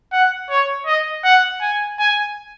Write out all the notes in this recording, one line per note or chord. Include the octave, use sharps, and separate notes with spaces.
F#5
C#5
D#5
F#5
G#5
G#5